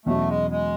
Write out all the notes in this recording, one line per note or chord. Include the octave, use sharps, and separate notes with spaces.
E2 B2 F#3 A3 C#4 F#4
G#3
G#3